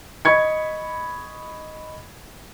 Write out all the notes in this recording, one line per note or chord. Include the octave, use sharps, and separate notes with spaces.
D#5 B5 C#6 G#6 C#7